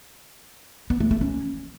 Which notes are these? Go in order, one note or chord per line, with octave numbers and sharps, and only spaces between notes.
B3
A3
A3
C#4